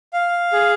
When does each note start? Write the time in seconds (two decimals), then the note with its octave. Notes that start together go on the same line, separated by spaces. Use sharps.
0.13 F5
0.53 G#4